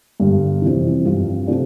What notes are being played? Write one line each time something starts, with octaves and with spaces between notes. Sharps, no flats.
G2 D3 G3
F2 C3 E3
G2 F3 C4 F4
C3 F3 A3 D4